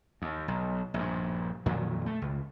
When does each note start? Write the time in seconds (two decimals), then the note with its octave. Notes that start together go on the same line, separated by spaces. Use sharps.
0.22 D#2
0.48 B1
0.94 A#1 G2
1.66 F2 A#2 D#3 F#3
2.06 A3
2.22 C#2